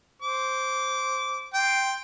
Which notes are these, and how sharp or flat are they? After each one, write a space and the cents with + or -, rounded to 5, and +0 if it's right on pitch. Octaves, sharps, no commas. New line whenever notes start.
C5 +0 D6 -20
G5 +0 C6 +0